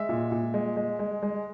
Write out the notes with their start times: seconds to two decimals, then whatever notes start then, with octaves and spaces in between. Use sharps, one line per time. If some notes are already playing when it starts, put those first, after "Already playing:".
Already playing: G#3 E5
0.09 A#2
0.32 A#2
0.54 G#3
0.77 G#3
0.99 G#3
1.23 G#3